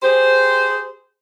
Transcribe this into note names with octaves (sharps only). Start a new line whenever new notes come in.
G4 G#4 C5